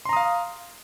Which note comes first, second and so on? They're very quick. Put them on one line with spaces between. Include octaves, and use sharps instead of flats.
C6 A#5 D#6 F5